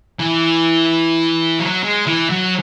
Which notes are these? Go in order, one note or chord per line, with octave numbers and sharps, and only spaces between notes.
E3
F#3
G#3
E3
F#3